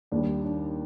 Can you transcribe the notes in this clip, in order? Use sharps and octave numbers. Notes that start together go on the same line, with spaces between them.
D#2 D#3 G3 D4
D4